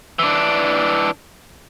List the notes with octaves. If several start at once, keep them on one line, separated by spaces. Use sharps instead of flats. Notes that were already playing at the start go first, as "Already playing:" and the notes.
E3 D4